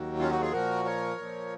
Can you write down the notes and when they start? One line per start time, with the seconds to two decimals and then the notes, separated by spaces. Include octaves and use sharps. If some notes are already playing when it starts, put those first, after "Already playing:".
Already playing: D#2 D#3 F#3
0.19 C#4 F4
0.30 D#4 F#4
0.41 F4 G#4
0.52 A#2 F3 F#4 A#4
0.85 A#4 C#5
1.17 A#2 F3